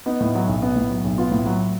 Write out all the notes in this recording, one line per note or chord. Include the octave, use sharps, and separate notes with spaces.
B3 D#4
A2
F#3
B1
B3
A2
F#3
B1
B3 F4
A2
F#3